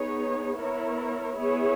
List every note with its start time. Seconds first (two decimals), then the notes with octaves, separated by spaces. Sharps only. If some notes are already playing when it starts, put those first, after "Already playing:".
Already playing: B3 D#4 G#4 C#5
0.59 B3 E4 A#4 C#5
1.37 B3 E4 G#4 C#5